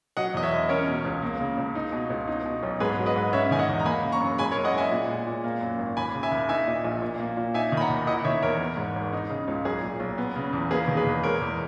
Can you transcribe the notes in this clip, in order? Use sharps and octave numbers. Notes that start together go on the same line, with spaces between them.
F#3 D#5 F#5
E2 D#5
C#5 E5
E1
C#4 A#4 C#5
B2
C#2
A#3
C#3
C#2
D#4
B2
C#2
D#4
B2
B1
G#2 G#4 B4
F#3
B4 D#5
G#2
C#4 C#5 E5
D#3 G#5
D#5 F#5
E2
A#5
A#3 G#5 B5
C#3
A#5 C#6
F#2
G#3 G#5 B5
A#4 C#5
F#2
D#5 F#5
F#1 E5 G#5
A#2
G#3
A#2
A#3
F#2
G#1
D#2 G#5 B5
C#3
E5 G#5
D#2
D#4 E5 G#5
A#2
A#1
A#2
A#3
A#2
D#4 E5 G#5
D#3
B5
F#5 A#5
D#2
E4 D#5 F#5
D#3 C#5 E5
E2 A#4 C#5
B3
G#2
G#1
D#4
C#3
C#2
B1 G#4
A#2
B1
B3
C#3
E2
A#3 G#4 B4
D#3
G#4 B4
E2
G#3 A#4 C#5
E2